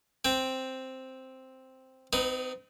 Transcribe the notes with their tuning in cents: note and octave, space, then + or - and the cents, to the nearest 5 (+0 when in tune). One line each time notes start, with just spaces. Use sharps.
C4 +0 G5 +0
C4 -40 D#4 +0 B4 +10